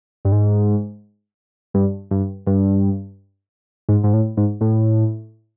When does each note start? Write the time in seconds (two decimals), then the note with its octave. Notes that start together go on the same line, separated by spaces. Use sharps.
0.25 G2
0.32 G#2
1.74 G2
2.11 G2
2.47 G2
3.89 G#2
4.04 G#2
4.13 A2
4.37 G#2
4.61 A2